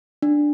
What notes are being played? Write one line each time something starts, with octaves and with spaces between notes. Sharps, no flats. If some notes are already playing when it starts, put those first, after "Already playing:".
D4